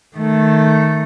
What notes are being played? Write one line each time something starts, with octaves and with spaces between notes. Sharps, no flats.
D#3 A3